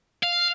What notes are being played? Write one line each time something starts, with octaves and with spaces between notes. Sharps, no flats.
F5